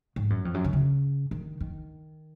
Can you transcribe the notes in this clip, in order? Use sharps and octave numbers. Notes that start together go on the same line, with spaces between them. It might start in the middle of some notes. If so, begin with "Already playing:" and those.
G#2
F#2
F2
F#2
D#3
C#3
D#3
D#3